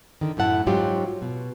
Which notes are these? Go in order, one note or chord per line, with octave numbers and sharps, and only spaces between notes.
D3 D#3
F#2 A2 E4 F#5 A5
G#2 F#3 C#4 F4 G4
B2